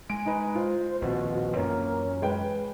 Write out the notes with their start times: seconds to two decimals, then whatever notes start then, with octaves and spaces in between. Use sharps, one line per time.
0.10 G#3 G#5 D7
0.25 D#4 B4
0.55 F4 C5
1.02 A#1 D#2 B2 C4 F#4
1.55 F#2 E3 A#3 C#4
2.22 G#3 B4 G5